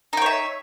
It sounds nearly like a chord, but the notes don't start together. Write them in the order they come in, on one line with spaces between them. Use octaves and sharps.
D#4 G5 C#5 E5